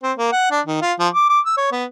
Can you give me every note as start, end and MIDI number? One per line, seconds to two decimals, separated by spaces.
0.03 0.12 60
0.18 0.29 58
0.32 0.51 78
0.51 0.60 62
0.67 0.80 51
0.81 0.93 65
0.99 1.08 53
1.13 1.29 86
1.30 1.40 86
1.46 1.55 88
1.57 1.69 73
1.72 1.85 59